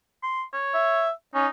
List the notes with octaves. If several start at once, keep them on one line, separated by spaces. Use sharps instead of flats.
C6
C#5
E5
C#4 D#4